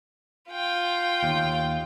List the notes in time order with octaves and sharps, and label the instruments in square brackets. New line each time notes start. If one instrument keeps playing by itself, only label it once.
[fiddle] F4 G5
[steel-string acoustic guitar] D#2